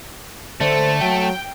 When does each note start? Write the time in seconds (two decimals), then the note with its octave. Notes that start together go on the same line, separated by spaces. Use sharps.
0.61 D3 A3 C5
1.01 F#3 G5